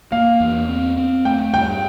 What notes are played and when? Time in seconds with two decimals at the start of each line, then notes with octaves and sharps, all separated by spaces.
0.12 A#3 F5
0.40 E2
0.69 C4
0.97 C4
1.25 A3 G5
1.53 G2 G5